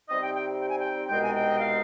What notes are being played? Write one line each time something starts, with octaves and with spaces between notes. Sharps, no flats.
C3 G3 C4 D#4 D#5
G5
G5
G5
G#5
G5
C2 B2 G#3 C4 D#4 G5
G#5
G5
D#5
F5